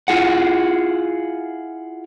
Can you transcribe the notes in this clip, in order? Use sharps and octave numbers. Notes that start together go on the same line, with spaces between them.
E4 F4 G#4 F#5